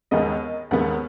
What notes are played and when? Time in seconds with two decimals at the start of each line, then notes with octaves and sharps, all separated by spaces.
0.11 D#2 D#3 G#3 B3 D#5
0.71 D#2 D#3 G#3 B3 F#5